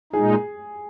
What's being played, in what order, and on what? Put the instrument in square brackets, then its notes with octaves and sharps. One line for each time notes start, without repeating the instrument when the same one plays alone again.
[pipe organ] A#2 G#3 D#4 [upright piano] G#4